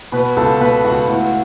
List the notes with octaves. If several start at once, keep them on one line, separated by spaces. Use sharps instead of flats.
B2 B4 B5
C#2 A4 A5
B2 B4 B5
C#2 F#4 F#5
A2